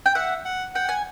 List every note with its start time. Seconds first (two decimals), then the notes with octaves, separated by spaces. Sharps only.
0.06 G5
0.15 E5 F#5
0.45 F#5
0.75 F#5 G5
0.89 G#5